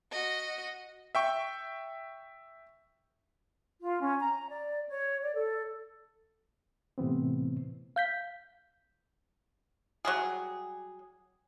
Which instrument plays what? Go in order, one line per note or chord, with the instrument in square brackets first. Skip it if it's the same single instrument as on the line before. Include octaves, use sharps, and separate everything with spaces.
[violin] F#4 D#5
[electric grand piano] E5 G5 C#6
[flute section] F4
C#4
A#5
D5
C#5
D5
A4
[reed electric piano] A2 C3 E3 B3 C4
[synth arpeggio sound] F5 G6 B6
[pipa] F#3 G3 G#4